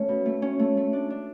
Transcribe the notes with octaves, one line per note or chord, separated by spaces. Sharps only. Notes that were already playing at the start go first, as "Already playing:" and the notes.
Already playing: A3 C#4
B2
A3
C#4
A3
A3
D4
D4